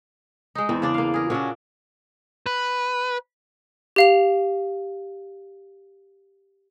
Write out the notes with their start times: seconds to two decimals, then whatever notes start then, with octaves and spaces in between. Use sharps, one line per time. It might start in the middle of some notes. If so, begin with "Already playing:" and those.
0.55 G#3 D#4
0.69 E2 C4
0.82 C#3 D4 D5
0.94 A#3 F5
1.14 G#4 A#4
1.30 A#2 C#4 D4 F#4
2.46 B4
3.96 G4 F5 F7